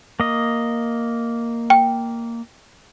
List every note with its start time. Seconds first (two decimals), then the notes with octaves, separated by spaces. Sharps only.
0.20 A#3 D#5
1.70 G5